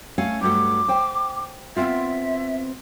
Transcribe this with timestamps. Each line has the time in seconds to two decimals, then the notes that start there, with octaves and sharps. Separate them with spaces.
0.18 A3 C#4 F5
0.41 G2 F#3 A3 D6
0.88 C5 G5
1.76 B3 C4 F4 E5